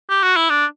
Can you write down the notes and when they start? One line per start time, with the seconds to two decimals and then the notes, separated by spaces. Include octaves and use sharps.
0.10 G4
0.23 F#4
0.36 E4
0.50 D4